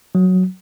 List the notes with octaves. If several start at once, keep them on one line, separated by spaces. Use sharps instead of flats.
F#3